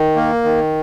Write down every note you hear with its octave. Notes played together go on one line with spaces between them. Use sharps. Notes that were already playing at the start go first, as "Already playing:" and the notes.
Already playing: D#3
A#3
D#3